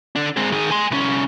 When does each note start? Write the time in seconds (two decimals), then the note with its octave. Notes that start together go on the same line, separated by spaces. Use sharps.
0.16 D3 D4
0.37 G#3 C4
0.52 D#3 G#4
0.71 G#5 C6
0.91 C2 C#4